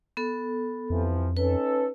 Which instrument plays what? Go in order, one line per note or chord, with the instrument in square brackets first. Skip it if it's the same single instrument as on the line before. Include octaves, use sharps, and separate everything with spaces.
[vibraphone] B3 A4
[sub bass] F2 [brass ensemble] C3 E3 F3
[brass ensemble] C#4 D#4 A4 [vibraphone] B4